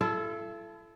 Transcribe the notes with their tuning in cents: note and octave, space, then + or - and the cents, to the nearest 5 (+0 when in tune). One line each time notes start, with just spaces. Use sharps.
E4 +45 A4 -10